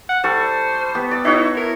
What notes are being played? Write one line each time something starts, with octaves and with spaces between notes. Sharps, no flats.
F#5
G3 A4 C5 C#6
B3 G4
D5 E6
D#4 E4 F#4 C#5
A#4